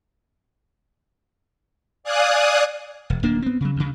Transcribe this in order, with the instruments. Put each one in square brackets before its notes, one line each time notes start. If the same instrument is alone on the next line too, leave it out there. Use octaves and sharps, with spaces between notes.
[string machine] D5 F5 G#5 D#6 F#6
[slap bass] E1
D1 A#3 D4
B3 C4
C#3 F#3
D2 C#3